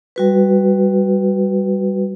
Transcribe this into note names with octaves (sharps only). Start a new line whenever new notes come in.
G3 F#4 B4